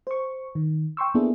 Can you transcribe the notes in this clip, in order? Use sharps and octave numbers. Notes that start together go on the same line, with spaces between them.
C5 C#6
D#3
G5 C6 C#6 E6
A#3 B3 D4 E4 G#4 A4